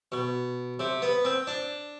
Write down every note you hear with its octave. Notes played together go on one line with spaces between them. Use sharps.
B2
C3
B3
C4
D4